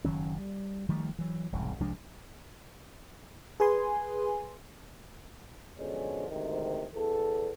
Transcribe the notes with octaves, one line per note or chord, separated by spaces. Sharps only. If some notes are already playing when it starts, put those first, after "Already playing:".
F#1 D#3 F#3 C#4
G3
D#3 F3 G3 A3
E3 F#3
E1 C2 G#2
C2 F3 G#3 D4
G#4 B4 G#5 C6
B2 D3 F3 G#3 C#4
D2 G#2 C3 D#3
E2 A4